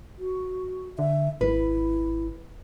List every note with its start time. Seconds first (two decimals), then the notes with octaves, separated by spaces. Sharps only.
0.19 F#4
0.99 D3 E5
1.41 G#1 E4 B4